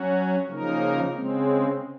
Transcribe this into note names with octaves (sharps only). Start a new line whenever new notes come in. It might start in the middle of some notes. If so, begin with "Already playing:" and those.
Already playing: F#3 C#4 F#4
C#3 F3 A#3 D#4 A#4
C#3 G#3 C4